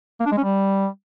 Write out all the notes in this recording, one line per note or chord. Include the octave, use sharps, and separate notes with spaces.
A#3
D4
G#3
C#4
G3